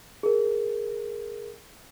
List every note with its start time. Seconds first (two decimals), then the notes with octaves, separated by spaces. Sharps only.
0.23 G#4 A#4